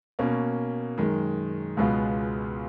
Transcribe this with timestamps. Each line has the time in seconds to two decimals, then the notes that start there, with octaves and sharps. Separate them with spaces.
0.19 B2 A#3 C#4
0.98 F#2 D#3 G#3
1.77 C#2 B2 G#3 B3 F4